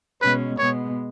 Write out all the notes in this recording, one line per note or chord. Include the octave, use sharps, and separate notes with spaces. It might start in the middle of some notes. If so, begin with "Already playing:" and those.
B2 G#3 C#4 B4
B2 G#3 B3 C#5